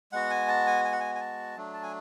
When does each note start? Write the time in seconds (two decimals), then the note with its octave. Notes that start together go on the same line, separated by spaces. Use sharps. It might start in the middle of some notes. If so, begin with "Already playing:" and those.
0.12 G#3 B3 F#4 F#5
0.30 G#5
0.48 A5
0.67 G#5
0.85 G#5
0.92 F#5
1.00 G#5
1.15 G#5
1.20 A5
1.56 F#3 A3 D4
1.74 A5
1.83 G#5